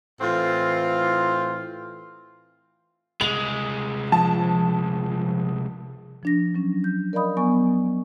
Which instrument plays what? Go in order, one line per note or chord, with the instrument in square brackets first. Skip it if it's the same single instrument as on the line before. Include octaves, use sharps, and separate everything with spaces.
[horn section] A2 E3 C4 F4
[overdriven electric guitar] C2 G#3 [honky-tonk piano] F7 F#7
[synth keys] F3 [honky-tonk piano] A5
[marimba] F3 D4 A#6
F#3 C#4
G6
A#4 D5 D#5 F5 B5 D#6
F#3 B3 G#5 C#6